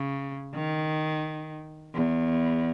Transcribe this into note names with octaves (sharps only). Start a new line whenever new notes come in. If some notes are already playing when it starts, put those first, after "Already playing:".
Already playing: C#3
D#3
E2